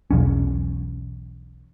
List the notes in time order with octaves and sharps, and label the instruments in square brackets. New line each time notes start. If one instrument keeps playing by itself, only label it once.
[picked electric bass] E1 B1 E2 C#4